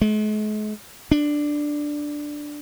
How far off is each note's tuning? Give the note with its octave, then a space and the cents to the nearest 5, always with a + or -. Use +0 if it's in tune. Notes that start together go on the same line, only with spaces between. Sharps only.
G#3 +45
D4 +5